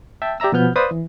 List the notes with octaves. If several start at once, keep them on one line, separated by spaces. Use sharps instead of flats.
E5 G5 A5
G4 D5 E5 A#5 E6
B2 F3 B3 F6 G6
B4 C5 D5 F5 D#6
E3